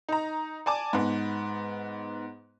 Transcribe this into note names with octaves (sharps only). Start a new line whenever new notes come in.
D#4 A#5
D5 G#5 A5 D6
G#2 B3